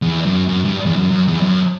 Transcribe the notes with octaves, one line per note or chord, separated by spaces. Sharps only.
E2
F#2
F#2
G2
E2
F#2
F#2
E2
F#2